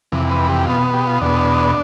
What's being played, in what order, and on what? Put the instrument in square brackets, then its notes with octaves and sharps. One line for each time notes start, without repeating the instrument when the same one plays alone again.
[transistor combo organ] F2 C3 E3
B4
G4
B2 B3 F4
G4
F4
E2 B2 B3 D4